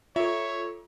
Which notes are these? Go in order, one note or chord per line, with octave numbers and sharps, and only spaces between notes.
F4 A4 C#5 E5